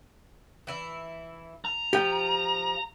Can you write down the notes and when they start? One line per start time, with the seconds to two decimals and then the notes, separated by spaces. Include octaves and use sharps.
0.67 E3 E4
1.65 A#5
1.93 F3 G4 G5